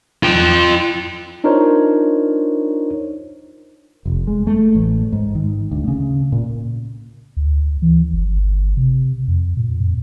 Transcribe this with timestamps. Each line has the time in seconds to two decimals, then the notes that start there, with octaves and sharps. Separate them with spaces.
0.23 F4 G5
1.44 D4 D#4 F4 A#4 C5 C#5
4.05 F1
4.27 G#3
4.47 A3
4.75 A1
5.13 G#2
5.35 D#3
5.71 D2
5.88 C#3
6.32 A#2
7.37 D2
7.82 E3
8.13 G1
8.77 C3
9.28 F2
9.57 A#2
9.80 F2